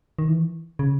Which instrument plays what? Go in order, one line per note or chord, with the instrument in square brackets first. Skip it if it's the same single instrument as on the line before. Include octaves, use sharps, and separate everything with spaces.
[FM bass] D#3
E3
C#3